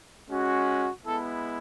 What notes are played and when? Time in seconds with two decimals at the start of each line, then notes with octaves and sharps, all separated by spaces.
0.28 G#3 C#4 F#4
1.05 G#3 B3 E4 A4